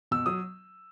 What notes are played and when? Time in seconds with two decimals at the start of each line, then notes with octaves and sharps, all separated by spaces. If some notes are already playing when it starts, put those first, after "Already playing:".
0.11 B2 E6
0.26 F#3 D#6